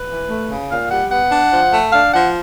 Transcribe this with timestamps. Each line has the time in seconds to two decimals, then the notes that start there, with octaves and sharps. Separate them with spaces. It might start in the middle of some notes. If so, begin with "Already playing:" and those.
Already playing: B4
0.09 E3
0.29 A3
0.50 C#3
0.70 A#2 F5
0.90 G3 F#5
1.11 B3 F#5
1.32 D4
1.52 F3
1.73 A3
1.93 D4 F5
2.13 F3 F#5